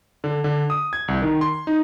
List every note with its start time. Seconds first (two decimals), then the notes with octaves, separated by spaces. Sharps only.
0.24 D3
0.44 D3
0.70 D#6
0.93 G#6
1.08 C2
1.22 D#3
1.41 C6
1.67 D#4